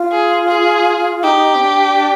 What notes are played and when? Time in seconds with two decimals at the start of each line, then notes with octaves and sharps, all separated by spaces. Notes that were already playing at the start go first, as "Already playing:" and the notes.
Already playing: F4
0.11 G#4
0.48 G#4
1.23 D#4 G4
1.55 C4
1.61 D4